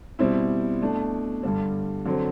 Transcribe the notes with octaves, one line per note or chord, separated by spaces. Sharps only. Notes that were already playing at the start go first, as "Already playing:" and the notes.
B2 G3 C4 E4
B2 A3 D4
G2 D3 G3
D3 F#3 C4